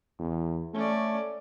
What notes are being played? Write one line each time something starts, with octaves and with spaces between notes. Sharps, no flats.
E2
A3 C#4 D5